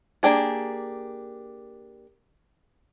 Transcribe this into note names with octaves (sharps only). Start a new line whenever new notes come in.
A#3 D4 G4 G#4